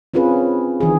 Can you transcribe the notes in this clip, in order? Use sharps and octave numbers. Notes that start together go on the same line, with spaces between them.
C4 C#4 F4 G#4 B4
D#3 E3 G#4